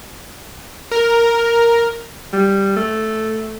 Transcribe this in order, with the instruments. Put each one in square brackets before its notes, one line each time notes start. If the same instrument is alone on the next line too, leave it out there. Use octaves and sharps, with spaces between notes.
[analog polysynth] A#4
[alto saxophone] G3
A3